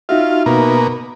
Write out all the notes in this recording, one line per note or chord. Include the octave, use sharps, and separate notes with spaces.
D#4 F4 F#4 E5
B2 A#3